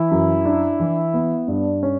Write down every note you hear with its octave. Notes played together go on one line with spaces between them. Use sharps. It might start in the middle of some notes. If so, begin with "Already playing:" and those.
Already playing: E3 E4
F#2
D4
E3
B3
G2 D4
C#4